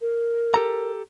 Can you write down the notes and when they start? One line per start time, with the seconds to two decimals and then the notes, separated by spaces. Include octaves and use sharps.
0.01 A#4
0.54 G4 A4 A#5